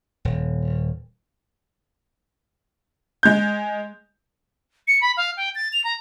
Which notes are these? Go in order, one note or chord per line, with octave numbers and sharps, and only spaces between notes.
D#1
G#3 G6
C#7
B5
F5
G5
A6
F7
A#5